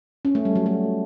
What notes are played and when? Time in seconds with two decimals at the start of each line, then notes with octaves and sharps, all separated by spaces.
0.25 C#4
0.35 A3
0.45 G3
0.56 F#3
0.66 A3